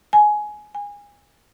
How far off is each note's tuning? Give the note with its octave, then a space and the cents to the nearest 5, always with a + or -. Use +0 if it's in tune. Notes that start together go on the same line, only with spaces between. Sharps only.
G#5 +15
G#5 -25